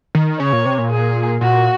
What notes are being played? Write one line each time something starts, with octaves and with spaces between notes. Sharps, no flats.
D#3
C#3 C#5
A#2
C3
A#2
G#4
A#2 F#4